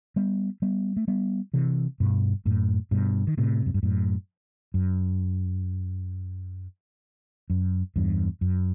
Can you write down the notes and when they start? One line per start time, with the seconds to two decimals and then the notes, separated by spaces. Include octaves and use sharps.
0.16 G3 B3
0.62 G3 B3
0.97 A3
1.08 G3 B3
1.53 C3 E3
2.00 G2 B2
2.45 F#2 A2
2.91 G2 B2
3.27 D#3
3.37 A2 C3
3.66 F#2
3.74 G2
3.83 F#2 A2
4.74 F#2
7.50 F#2
7.96 E2 G2
8.41 F#2